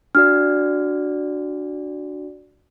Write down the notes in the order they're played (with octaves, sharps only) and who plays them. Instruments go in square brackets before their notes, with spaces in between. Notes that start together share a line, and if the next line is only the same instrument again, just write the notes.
[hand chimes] D4 F#4 D5 [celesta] F6